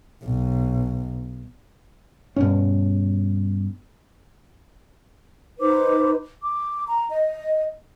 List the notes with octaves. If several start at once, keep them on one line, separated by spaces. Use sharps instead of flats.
B1
G2 B2 C#4
D#4 B4 C5 D6
D6
A#5
D#5